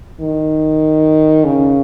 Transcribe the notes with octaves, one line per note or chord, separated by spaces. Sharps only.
D#3
C#3